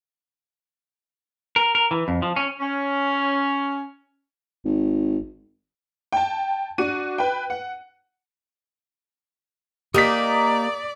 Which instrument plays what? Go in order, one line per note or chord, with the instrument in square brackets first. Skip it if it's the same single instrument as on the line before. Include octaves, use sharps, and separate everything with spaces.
[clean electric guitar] A#4
A#4
E3
F2
F3
C#4
[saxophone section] C#4
[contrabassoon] G#1
[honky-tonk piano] G5 A5
D4 F#4 D#7
B4 G5
F#5
[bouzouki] A#3 D#4 [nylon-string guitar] G4 A#4 [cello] D5 [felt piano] D#6 B6